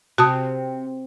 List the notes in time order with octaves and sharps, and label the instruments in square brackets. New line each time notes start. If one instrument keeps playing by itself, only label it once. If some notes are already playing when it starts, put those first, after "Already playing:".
[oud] C3 [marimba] F#4 A5 D#6